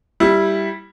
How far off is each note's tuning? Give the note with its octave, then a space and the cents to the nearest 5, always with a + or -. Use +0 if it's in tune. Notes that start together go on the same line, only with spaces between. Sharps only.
G3 +0 E4 +0